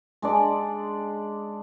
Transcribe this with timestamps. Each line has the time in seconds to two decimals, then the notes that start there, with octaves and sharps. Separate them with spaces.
0.22 G#3 D4 D5